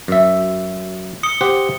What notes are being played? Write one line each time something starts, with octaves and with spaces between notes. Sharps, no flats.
F#2 E5
D#6 C#7 G7
G4 C5 F#5